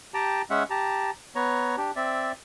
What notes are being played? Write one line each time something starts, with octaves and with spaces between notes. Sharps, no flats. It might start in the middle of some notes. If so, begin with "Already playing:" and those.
G4 G5 A5 A#5
G#3 C#4 E5 F#5
G4 A5 A#5
B3 C#5 A#5
D4 G4
C4 D5 E5